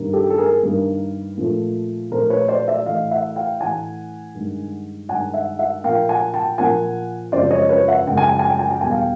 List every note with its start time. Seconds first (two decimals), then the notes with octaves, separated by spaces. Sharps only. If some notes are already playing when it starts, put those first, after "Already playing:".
Already playing: G2 D#3 G3 A#3
0.13 G4 A4
0.30 A4
0.38 G#4 A#4
0.63 G2 D#3 G3 A#3
1.37 A#2 F3 A3
2.11 A#2 F3 A3 A#4 C5
2.30 B4 C#5
2.48 C5 D5
2.68 D5 E5
2.86 A2 E3 A3 D#5 F5
3.11 E5 F#5
3.36 F5 G5
3.60 A2 E3 A3 F#5 G#5
4.35 G2 D#3 G#3
5.09 G2 D#3 G#3 F#5 G#5
5.34 E5 F#5
5.59 E5 F#5
5.83 A#2 F3 A#3 F5 G5
6.09 F#5 G#5
6.34 G5 A5
6.58 A#2 F3 A#3 F#5 G#5
7.32 F#2 C#3 F3 G#3 C5 D5
7.51 C#5 D#5
7.69 B4 C#5
7.88 E5 F#5
8.07 F#2 C#3 F3 G#3 G5
8.17 G#5
8.28 G5
8.39 G#5
8.49 G5
8.59 G#5
8.71 G5
8.81 E2 B2 G3 A#3 G#5
8.91 F5 G5